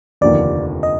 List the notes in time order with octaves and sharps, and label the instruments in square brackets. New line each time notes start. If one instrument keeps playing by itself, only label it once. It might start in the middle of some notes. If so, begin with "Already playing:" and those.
[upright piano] F1 D#2 D3 F3 A#3 [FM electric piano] D5
[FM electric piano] D#5